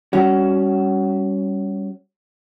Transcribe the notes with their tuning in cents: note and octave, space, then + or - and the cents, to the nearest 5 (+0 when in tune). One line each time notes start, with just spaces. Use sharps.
G3 +0 C#4 +5 F#4 +25